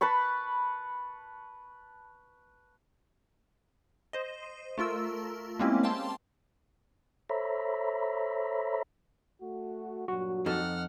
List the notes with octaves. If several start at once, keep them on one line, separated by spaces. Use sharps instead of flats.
B4 A5 B5 C#6
C5 D#5
A3 F4 A#4 E6
G#3 A#3 C4 C#4 E4 G4
F5 G5 A5 C6
A4 C5 C#5 E5 A#5 B5
A3 F#4
G2 A#2 F#3 F#4
F2 D#4 A4 F#5 F6